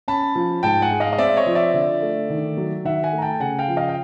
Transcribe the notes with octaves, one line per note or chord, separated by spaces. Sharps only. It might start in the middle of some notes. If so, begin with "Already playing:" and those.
C#4 A5 B5
F3
G#2 G5 A5
F#5 G#5
G#3
D#5 F5
D#5
C4 D5 E5
C#5 D#5
F3
D5 E5
D3
A3
D#3
F#3
D#3 E5 F#5
F#5 G#5
A3
A#5
G5 A5
C#3 F#5 G#5
F5 G5
F3
D#5 F5
G5